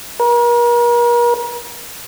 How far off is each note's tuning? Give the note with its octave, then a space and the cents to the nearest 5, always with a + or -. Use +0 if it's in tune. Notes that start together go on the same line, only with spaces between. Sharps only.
A#4 +40